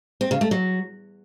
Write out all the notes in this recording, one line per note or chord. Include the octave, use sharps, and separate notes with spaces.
C4
C#3
A3
F#3